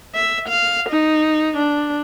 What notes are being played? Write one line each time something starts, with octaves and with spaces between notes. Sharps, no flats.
E5
F5
D#4
D4